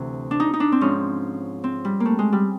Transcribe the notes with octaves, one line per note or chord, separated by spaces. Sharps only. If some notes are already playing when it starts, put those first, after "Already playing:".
Already playing: D2 C3 E3
D4
D#4
D#4
D4
C4
G#2 F3 C#4
C4
G3
A#3
A3
G#3
G3